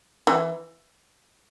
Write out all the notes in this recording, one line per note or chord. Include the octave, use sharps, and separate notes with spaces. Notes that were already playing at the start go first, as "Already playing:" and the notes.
E3